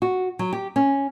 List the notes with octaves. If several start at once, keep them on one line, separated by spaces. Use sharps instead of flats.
F#4
F#3
G4
C#4